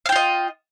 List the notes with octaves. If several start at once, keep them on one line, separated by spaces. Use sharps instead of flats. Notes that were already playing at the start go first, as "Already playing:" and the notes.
F4 D#5 F5 G5